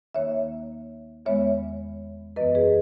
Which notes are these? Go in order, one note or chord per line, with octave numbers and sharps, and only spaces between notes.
D#2 D#3 A#3 C#5 E5
E2 D#3 G#3 B3 C#5 E5
F#2 E3 B3 B4 D#5
G#4 B4